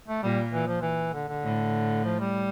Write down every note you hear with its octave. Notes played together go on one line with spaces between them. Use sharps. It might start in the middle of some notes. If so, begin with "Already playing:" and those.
A3
A#2 G3
E3
F3
E3
D3
D3
A2
F3
G3